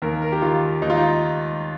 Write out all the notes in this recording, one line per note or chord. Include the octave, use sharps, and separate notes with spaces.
D#2 A#4
A#4
G4
D#3 F4
D#2 D#4
F4
D#4